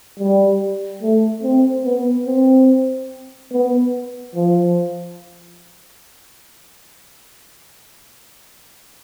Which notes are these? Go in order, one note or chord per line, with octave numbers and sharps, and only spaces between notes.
G3
A3
C4
B3
C4
B3
F3